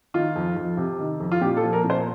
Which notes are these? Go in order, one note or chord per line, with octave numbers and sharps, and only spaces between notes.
D#3 F4
F2
F2
C3
D#3
F2
F4
A#2 G4
A4
F3
A#4
A#2
C5